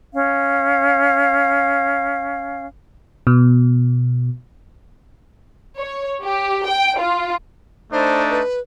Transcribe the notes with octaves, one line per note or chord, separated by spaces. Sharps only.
C#4 F5
B2
C#5
G4
G5
F4
A3 D4 D#4 C5
B4